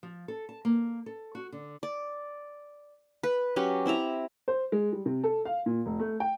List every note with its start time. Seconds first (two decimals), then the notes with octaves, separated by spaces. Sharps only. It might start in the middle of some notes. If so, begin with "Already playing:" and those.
0.03 F3
0.28 A4
0.49 A5
0.65 A#3
1.06 A4
1.35 F#4
1.52 D3
1.83 D5
3.23 B4
3.56 F#3 C#4 G4 B4
3.86 C4 E4 E5 A#5
4.48 C5
4.72 G#3
4.93 G3
5.06 C3
5.24 A4
5.45 F5
5.66 A#2
5.86 F1
6.00 A3
6.20 G5